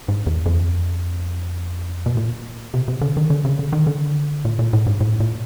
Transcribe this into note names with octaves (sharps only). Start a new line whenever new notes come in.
G#2
E2
F2
B2
A#2
C3
C3
D3
D#3
D3
C#3
D3
D#3
D3
A#2
A#2
A2
G#2
A2
A#2